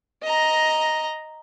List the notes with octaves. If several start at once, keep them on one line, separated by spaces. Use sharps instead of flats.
D#5 A#5